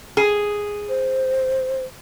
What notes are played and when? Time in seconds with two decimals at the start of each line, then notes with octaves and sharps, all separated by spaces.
0.17 G#4
0.89 C5